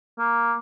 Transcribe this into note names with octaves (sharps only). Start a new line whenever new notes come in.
A#3